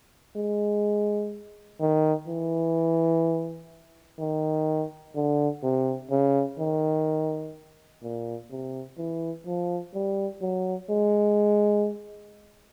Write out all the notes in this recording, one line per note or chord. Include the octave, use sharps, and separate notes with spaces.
G#3
D#3
E3
D#3
D3
C3
C#3
D#3
A#2
C3
E3
F3
G3
F#3
G#3